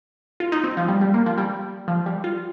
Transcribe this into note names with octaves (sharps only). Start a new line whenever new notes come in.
F4
D#4
C4
F3
G3
G3
A#3
F3
G3
F3
G3
F4